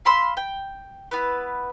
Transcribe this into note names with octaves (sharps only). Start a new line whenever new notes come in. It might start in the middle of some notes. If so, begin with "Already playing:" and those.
F5 B5 C6 E6
G5
B3 E4 B4